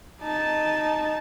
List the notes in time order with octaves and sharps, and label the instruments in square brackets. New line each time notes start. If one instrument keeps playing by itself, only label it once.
[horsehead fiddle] D#4 A5